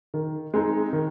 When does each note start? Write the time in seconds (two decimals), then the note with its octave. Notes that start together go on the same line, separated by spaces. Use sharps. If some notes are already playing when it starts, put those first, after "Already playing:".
0.14 D#3
0.54 G#3 C4 D#4 G#4
0.93 D#3